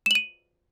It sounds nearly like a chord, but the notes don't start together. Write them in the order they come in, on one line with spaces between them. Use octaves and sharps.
E7 F#7 D#7